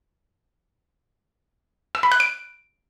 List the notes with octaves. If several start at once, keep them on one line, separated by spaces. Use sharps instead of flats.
E6
B5
F#6
D7